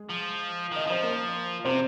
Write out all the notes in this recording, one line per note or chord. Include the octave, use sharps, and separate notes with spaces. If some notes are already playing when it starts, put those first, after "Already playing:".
Already playing: G#3 G#4
F3
D#3 D#5
F3 C5
A#3 A#4
C3 C4 C5